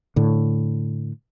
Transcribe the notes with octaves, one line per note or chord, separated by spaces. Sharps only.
A2 D3